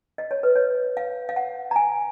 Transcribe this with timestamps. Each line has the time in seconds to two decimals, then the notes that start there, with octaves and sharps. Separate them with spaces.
0.18 D#5
0.31 C#5
0.43 B4
0.56 C#5
0.97 F5
1.29 F5
1.36 F#5
1.71 A#5
1.76 G#5